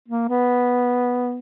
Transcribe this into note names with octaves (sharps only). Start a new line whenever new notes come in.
A#3
B3